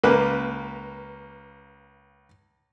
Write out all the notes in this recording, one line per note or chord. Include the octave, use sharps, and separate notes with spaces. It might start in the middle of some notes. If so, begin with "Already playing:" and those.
C#2 A#3 B4